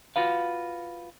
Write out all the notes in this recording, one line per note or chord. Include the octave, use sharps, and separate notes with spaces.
F4 F#4 B4 F5